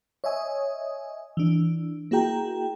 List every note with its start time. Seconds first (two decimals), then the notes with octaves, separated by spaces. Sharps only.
0.24 C#5 D#5 E5 G#5 D#6
1.37 E3 D4
2.11 A#3 E4 F#4 G#4 G5 A#5